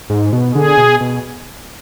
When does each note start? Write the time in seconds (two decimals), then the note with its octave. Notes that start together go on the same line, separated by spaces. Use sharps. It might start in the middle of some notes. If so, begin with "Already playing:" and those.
0.10 G#2
0.33 B2
0.55 D3 G#4
0.77 B2
1.01 B2